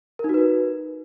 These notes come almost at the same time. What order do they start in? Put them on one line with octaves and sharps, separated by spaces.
A#4 D#4 F#4 B4